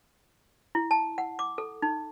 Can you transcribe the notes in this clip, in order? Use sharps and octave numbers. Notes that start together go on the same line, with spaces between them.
E4
A5
F#5
D6
A4
D#4